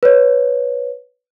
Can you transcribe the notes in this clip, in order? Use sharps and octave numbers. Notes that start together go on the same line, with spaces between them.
B4 C#5